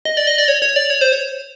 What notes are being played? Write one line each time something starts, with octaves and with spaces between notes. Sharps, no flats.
D#5
D5
D#5
D5
C#5
C#5
D5
C#5
C5
C#5